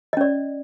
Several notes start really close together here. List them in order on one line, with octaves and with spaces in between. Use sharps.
D#5 C#4 D5